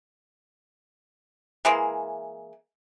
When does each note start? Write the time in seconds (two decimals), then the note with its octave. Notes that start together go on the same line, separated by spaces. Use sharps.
1.65 E3 G#3 A#3